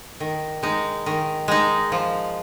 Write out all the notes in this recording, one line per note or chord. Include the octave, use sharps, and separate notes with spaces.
D#3
G#3 D#4
D#3
G#3 D#4
F3